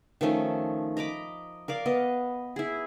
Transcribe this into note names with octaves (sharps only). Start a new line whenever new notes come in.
D#3 F3 A3 C#4
D#5 A#5 B5 D6
A#4 D5 F5
B3 D#5
E4 G#4